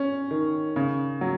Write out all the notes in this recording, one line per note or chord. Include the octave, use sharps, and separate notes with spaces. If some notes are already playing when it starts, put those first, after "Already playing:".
Already playing: C#4
D#3
C#3
F#3